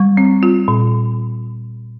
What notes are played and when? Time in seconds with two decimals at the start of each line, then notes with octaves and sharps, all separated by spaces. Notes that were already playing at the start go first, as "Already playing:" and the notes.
Already playing: G3 C#6
0.17 C4
0.43 F4
0.68 A#2